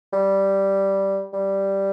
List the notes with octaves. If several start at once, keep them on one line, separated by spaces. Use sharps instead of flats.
G3
G3